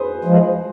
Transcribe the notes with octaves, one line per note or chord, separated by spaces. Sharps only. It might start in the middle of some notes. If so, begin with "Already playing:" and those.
Already playing: G#4 B4 C5
F3 G#3